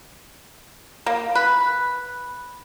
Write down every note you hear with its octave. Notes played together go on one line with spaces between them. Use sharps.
A#3
B4